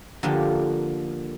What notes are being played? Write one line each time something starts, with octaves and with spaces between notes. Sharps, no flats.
D3 F3 A#3 G4